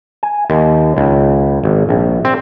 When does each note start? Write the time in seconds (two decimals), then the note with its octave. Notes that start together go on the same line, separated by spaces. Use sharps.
0.23 G#5
0.50 D#2
0.97 C#2
1.64 G#1
1.89 A#1
2.25 C4